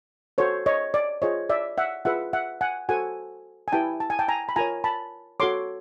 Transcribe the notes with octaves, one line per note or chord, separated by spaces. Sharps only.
F#4 A4 C5 C#5
C#5 D#5
D5
F4 G#4 C5 C#5 D#5
D5 E5
E5 F#5
F4 G#4 B4 E5 F#5
E5 F#5
F#5 G#5
F#4 A4 C5 F#5 G#5
G#5
E4 G4 B4 G5 A5
A5
G#5
G5 A5
G#5 A#5
B5
F4 A#4 C#5 G#5 A#5
A5 B5
F#4 A4 C#5 C6 D6